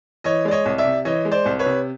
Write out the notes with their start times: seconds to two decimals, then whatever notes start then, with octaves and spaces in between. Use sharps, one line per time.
0.24 E3 C#5 D#5
0.45 G#3 D5
0.51 C#5 D#5
0.65 C2
0.78 D5 E5
0.85 C3
1.05 E3 C#5 D#5
1.25 G#3
1.32 C5 D5
1.45 C2
1.59 B4 C#5
1.66 C3